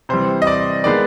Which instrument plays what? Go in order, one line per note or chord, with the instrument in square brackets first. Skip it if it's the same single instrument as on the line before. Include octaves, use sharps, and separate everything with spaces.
[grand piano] C3 E3 G3 C5
D#5
D5
D#3 G#3 B3 D5